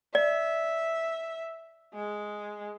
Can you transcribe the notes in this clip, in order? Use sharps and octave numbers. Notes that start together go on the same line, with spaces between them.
D5 E5
G#3